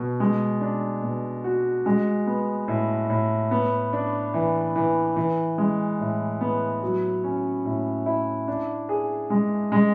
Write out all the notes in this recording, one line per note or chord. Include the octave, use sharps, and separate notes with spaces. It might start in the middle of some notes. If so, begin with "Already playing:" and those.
Already playing: B2
G#3
D4
B2
F#4
G#3
B3
A2
A2
B3
D4
E3
E3
E3
G#3
A2
B3
F#3
C#4
A2
E4
D4
G#4
G#3
G#3